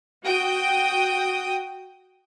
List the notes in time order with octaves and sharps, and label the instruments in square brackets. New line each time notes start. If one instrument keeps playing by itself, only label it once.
[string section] F#4 G5 D#6